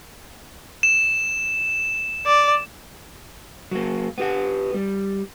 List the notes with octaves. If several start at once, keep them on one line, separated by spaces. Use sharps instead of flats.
E7
D5
F#3 A#3
B3 G4 F#5
G3